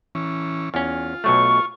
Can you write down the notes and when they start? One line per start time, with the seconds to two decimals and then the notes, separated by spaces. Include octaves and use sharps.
0.15 E3 C#4
0.74 E2 C#4 F4
1.24 B1 F#3 A3 C#6